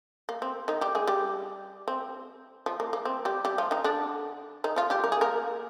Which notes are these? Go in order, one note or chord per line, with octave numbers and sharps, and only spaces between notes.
A#3
C4
D#3 D#4
G3 G4
G#3 G#4
G3 G4
C4
F3
A#3
A#3
C4
G3 G4
G3 G4
F3 F4
D#3 D#4
D3 D4
D#3 D#4
F3 F4
G3 G4
A#4
G#4
A#3 A#4